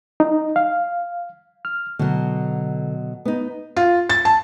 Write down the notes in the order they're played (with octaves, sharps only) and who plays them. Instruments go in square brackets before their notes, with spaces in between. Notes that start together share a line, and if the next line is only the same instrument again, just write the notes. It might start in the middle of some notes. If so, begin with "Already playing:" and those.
[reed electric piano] D#4
F5
F6
[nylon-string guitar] B2 F#3 [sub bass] D3
[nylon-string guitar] B3 D#4
[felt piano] F4
A6
A5